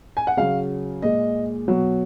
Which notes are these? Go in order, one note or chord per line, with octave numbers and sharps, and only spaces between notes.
G#5
F#5
C#3 F#3 F5
A#2 G#3 D#5
B2 F#3